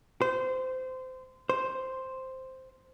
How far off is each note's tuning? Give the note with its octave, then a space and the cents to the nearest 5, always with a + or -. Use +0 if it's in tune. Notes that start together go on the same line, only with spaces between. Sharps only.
C5 -20
C5 +0